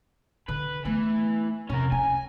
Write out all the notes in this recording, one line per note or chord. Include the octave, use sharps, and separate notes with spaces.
D3 B4
E3 A3 B3
F2 C3 C#4 A#4
C#4 G#5